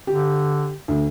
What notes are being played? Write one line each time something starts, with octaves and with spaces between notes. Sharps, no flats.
D3 G4
D2